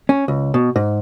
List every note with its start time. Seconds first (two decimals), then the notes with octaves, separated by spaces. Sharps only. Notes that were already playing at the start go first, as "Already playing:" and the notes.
0.09 C#4
0.28 C#2
0.54 B2
0.76 G#2